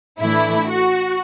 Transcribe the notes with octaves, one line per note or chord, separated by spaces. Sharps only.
A2 E3 A3 D4 E4
F#4